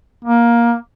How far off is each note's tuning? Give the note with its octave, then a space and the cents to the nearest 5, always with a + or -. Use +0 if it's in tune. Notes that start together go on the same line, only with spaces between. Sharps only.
A#3 +15